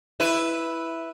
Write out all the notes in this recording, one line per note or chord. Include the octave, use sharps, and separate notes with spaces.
E4 B4